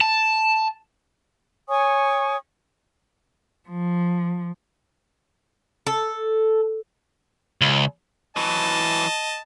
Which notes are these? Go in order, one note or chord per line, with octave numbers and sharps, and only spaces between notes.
A5
C#5 G#5 C#6 D#6
F3
A4
C#2
E3 F#3 D#5 A5